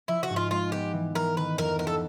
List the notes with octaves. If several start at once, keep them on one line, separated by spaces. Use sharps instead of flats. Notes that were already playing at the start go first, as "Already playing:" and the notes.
F3 E4
F#4
G#2
F4
G#3 F4
B3 G4
E3
E3 A#4
D#3 B4
F2 A#4
B3 A#4
A4